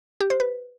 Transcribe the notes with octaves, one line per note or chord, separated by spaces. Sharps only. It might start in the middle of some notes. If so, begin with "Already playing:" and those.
G4
C5
B4